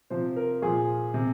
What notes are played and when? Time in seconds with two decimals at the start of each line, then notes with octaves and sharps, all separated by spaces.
0.10 C3 F3 C5
0.36 A#4
0.62 A#2 F3 G#4
1.14 C3